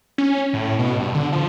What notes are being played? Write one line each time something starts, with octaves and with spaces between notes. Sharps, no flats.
C#4
A2
B2
G2
D3
F3